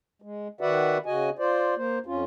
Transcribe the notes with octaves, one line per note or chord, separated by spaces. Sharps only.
G#3
D#3 F#4 B4 D5 E5 F#5
C#3 F#4 D#5 G#5
F4 C5 D5
A#3 C5
F2 C#4 F4